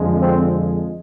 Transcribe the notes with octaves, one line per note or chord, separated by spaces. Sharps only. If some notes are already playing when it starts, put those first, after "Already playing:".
Already playing: F2 D3 F3 G#3
C4